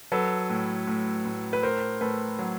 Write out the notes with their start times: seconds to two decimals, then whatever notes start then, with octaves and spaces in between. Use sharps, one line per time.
0.12 F#3 A4 B4
0.49 A2
0.87 A2
1.25 A2
1.53 B4
1.63 A2 A#4 C5
2.01 A2 A4 B4
2.39 F#3